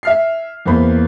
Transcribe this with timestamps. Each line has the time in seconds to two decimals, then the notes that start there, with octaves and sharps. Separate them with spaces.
0.03 E5 F6 C7
0.66 E2 A#3 C5 B5